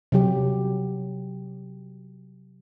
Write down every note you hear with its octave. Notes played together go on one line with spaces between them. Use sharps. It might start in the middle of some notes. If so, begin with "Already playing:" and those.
C3 F#3 G4